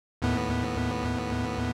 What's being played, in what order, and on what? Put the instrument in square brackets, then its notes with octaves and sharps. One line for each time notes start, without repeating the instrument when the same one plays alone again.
[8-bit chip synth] D#2 A2 B3